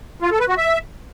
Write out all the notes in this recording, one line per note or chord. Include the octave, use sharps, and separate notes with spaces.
F4
A4
B4
F#4
E5